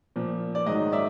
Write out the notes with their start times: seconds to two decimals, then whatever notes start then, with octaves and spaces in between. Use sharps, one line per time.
0.16 A#2 F3
0.55 D5
0.66 G#2 D#3 F#3 D#5
0.92 D5 E5